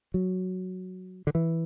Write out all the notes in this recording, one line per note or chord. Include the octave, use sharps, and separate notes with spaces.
F#3
D3
E3